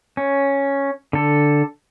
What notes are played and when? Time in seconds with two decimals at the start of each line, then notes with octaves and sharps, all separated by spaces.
0.17 C#4
1.13 D3 A4